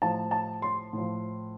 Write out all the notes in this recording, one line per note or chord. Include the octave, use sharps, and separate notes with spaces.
A2 F3 A5
A5
C6
A2 F3